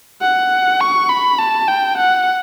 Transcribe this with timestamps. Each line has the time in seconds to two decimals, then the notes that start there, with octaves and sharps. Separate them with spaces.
0.21 F#5
0.80 C#6
1.09 B5
1.39 A5
1.68 G5
1.97 F#5